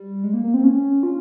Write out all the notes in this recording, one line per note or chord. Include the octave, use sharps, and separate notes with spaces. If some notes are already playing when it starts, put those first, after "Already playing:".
Already playing: G3
G#3
A#3
A#3
C4
C#4
F4